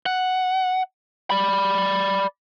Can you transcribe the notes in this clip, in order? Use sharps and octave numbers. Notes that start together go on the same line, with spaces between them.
F#5
D5 B5